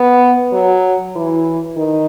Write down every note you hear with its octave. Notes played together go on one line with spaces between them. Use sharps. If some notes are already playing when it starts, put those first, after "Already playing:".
Already playing: B3
F#3
E3
D#3